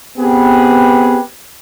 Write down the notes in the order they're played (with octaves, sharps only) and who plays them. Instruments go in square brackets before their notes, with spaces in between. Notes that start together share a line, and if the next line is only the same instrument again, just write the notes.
[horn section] B3 C4 G4 G#4 B4